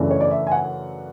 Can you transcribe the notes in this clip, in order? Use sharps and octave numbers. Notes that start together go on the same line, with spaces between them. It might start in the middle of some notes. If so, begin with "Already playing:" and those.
Already playing: F#2 C#3 E3 A3 D4
C#5
D5
E5
G#5
F#5